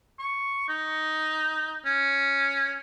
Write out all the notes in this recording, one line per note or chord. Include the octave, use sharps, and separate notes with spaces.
C#6
D#4
C#4